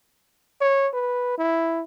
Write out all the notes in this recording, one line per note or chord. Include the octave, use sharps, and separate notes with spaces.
C#5
B4
E4